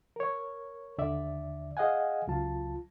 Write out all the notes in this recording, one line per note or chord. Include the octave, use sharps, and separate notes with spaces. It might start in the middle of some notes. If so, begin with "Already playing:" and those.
A#4 C#5
D#2 D3 D5 E5
G#4 D#5 F5 F#5 G#5
C#2 F#3 F4 A5